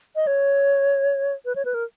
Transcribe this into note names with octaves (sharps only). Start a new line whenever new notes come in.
D#5
C#5
B4
C#5
B4
A#4